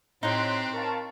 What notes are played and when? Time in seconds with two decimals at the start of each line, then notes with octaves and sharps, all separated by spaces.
0.23 A2 C4 D#4 G4 C#5 C6 F#6
0.73 A#4 F5 A5 C#6